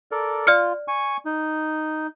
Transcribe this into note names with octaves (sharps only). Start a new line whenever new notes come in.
A4 A#4 D5
F4 D5 F6 C#7
G#5 C#6
D#4